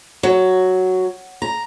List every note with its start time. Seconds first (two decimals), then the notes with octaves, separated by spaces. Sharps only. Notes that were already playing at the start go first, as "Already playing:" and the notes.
0.23 F#3
1.42 A#5